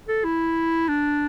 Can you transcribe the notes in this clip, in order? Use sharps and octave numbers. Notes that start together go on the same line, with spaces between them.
A4
E4
D4